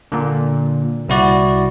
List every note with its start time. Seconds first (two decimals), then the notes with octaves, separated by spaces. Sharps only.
0.12 A#2 D3
1.09 C2 E4 F#4 D5